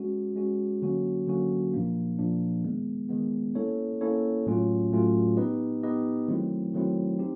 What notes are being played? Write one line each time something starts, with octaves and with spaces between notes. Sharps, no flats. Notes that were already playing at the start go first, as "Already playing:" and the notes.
Already playing: G#3 C#4 F#4
G#3 C#4 F#4
D3 F#3 A#3 C#4 F#4
D3 F#3 A#3 C#4 F#4
A#2 F3 A#3 D4
A#2 F3 A#3 D4
D#3 G#3 B3
D#3 G#3 B3
A#3 C#4 E4 A4 C#5
A#3 C#4 E4 A4 C#5
A2 F#3 A3 C#4 F4
A2 F#3 A3 C#4 F4
B3 D#4 G4 B4 D#5
B3 D#4 G4 B4 D#5
D#3 F#3 A3 C4 E4
D#3 F#3 A3 C4 E4
C4 D#4 G4